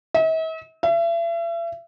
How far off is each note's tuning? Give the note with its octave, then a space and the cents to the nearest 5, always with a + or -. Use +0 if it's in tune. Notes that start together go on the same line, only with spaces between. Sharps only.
E5 -45
E5 +40